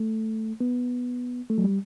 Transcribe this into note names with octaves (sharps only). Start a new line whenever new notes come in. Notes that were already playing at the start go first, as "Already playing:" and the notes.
Already playing: A3
B3
A3
F#3
G3